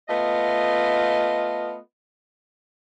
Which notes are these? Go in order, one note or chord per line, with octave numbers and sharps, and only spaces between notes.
A3 B3 F4 D#5